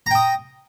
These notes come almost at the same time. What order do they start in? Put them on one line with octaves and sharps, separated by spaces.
A#5 G5 D#6